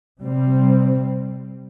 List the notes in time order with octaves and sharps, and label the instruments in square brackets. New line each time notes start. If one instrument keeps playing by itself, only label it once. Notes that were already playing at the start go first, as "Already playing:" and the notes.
[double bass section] C3 G3 C4